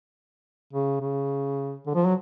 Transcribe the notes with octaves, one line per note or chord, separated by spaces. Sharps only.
C#3
C#3
D3
F3
F#3